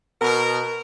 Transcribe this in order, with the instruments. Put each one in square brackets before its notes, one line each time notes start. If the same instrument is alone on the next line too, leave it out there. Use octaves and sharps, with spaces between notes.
[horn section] B2 A#4